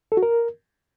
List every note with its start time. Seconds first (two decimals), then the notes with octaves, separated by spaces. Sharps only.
0.12 A4
0.17 F#4
0.23 A#4